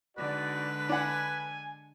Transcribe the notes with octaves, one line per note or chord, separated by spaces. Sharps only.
D3 G#3 D#4 F#4 B4 D5
D4 F#5 G#5